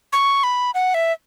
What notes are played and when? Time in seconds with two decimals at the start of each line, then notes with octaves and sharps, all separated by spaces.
0.13 C#6
0.44 B5
0.74 F#5
0.94 E5